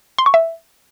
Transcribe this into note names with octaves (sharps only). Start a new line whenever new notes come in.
C6
C#6
E5